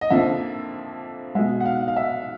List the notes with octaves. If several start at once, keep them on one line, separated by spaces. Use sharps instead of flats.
D#5
F2 D3 F3 A#3 E5
B2 G#3 E5
F#5
F5
F5
E5